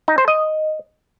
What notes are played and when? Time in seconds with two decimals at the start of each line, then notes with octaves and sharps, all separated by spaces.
0.08 D#4
0.18 C5
0.28 D#5